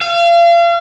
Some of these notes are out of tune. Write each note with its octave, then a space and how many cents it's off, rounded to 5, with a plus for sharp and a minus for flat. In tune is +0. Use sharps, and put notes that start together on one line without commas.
F5 -35